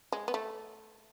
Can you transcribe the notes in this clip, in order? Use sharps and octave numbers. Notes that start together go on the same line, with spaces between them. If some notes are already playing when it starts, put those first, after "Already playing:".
G#3
B3
A3